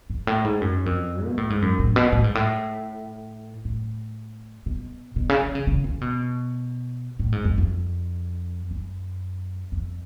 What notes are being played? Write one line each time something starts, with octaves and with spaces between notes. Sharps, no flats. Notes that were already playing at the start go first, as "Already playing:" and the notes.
G#2
A2
G#2
F#2
F2
B2
A2
G#2
F#2
A2
B2
A2
G#2
A2
A2
B2
B2
C#3
D3
C#3
C#3
C#3
B2
A2
G#2
F2
F2
F#2
F2